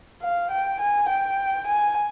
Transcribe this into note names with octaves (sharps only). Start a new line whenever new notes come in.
F5
G5
G#5
G5
G#5